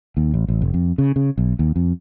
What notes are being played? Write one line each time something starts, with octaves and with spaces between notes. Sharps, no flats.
D#2
A1
A1
F1
F2
C#3
C#3
B1
D#2
F2